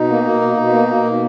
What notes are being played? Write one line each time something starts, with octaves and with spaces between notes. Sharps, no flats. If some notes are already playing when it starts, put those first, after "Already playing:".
Already playing: B2 D#4
A#3
A#3
B2
B2
A#3
A#3
B2